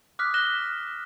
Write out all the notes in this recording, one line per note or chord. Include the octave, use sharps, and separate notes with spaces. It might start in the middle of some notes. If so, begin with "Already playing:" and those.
D6 D#6 F6 F#6 B6
F6 F#6 A#6 E7 G7